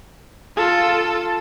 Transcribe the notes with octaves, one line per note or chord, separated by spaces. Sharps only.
F4 A4